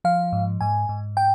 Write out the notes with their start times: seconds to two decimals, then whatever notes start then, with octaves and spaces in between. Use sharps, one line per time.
0.04 F3 F5
0.33 G#2
0.61 G#2 G#5
0.89 G#2
1.17 G5